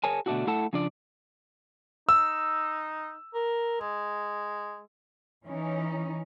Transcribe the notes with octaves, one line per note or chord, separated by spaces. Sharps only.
G#4 A#4 C#5 G#5 A5
B2 D3 A3 D4 E4 F#4
A3 E4 A4 F#5 A5
C#3 F3 D4 F4 D5
D#4 E6
A#4
G#3
E3 C#4 D#4